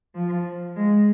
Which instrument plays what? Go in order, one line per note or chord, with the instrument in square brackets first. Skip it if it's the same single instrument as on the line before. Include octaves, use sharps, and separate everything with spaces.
[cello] F3
G#3